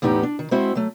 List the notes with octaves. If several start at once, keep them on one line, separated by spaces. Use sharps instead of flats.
E2 A2 B3 D#4 G4
D4
D#3
G#3 C4 E4 F#4 C5 E5
F#3 A3